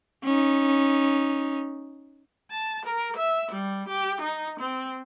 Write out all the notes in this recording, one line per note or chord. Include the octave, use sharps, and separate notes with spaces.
C#4 D#4
A5
A#4
E5
G3
G4
D#4
C4